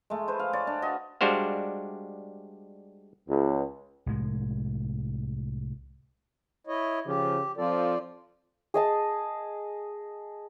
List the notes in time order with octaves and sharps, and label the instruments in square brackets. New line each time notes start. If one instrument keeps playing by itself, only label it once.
[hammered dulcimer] G#3 A3
B4 C5
F5
C#5 D5
D4
F#4 D#5 G#5
[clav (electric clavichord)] G3 G#3 D4 F#4 C5 F5
[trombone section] C#2
[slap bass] C2 A2 G#3
[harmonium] E4 C#5 D#5
[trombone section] C#3 F3 [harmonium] G4
[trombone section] F3 C4 A4 [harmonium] F4 D5
[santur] G#4 D#5 A5